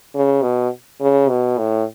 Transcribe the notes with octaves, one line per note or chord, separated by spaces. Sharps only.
C#3
B2
C#3
B2
A2